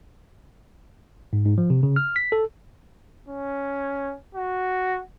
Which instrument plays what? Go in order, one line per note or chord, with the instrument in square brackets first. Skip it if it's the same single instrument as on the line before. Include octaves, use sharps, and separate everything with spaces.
[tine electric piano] G#2
G#2
F3
C3
C#3
F6
B6
A4
[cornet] C#4
F#4